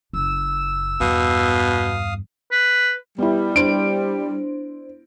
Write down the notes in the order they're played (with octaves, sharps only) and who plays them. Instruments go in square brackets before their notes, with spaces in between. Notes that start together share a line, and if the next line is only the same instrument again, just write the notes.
[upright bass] F#1 [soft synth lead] E6
[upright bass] E2 G2 [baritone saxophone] B2 [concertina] F5 D#6
[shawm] B4
[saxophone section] G3 [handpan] B3 E4
[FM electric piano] D4 C5 [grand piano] D7